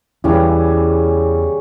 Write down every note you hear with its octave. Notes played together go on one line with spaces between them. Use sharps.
E2 C#3 E3 G3 C#4